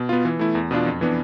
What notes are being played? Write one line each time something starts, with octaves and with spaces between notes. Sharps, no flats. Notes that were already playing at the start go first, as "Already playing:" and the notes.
Already playing: B2
B3 F4
E3
A3 E4
E2
B2 B3 D4 F4
F2
E3 B3 D4